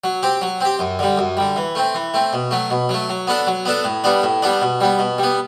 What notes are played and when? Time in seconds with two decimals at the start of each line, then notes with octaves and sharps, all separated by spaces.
0.04 F#3
0.23 C4 G4
0.42 F#3
0.61 C4 G4
0.79 F#2
0.99 D3 G3
1.18 F#2
1.37 D3 G3
1.56 E3
1.75 A3 C4
1.95 E3
2.14 A3 C4
2.33 B2
2.51 F#3 A3
2.70 B2
2.89 F#3 A3
3.09 F#3
3.27 B3 D4 A4
3.47 F#3
3.65 B3 D4 A4
3.84 A2
4.04 G3 B3 D4
4.23 A2
4.42 G3 B3 D4
4.62 B2
4.81 G3 B3
4.99 B2
5.18 G3 B3